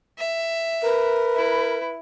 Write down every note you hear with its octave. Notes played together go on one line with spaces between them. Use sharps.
E5
A#4 B4
E4